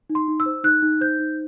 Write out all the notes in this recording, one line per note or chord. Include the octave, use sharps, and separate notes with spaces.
D#4
C6
D#4
E6
C5
D#4 F#6
D#4
C5 G6
D#4